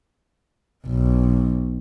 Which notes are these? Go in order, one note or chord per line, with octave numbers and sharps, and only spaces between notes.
B1